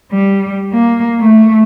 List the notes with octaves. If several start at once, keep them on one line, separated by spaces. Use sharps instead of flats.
G3
A#3
A3